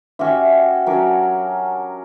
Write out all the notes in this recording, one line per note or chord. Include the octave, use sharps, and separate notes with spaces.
C#4 F#4 G4 E5
F#3 C#4 D4 A#4